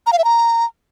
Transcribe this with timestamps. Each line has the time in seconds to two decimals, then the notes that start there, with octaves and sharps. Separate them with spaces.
0.07 A#5
0.13 F5
0.18 E5
0.24 A#5